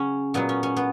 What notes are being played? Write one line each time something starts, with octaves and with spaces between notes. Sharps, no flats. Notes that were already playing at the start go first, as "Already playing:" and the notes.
Already playing: C#3 F#3 C#4
A#2 F#3 B3
C#4
C#4
B3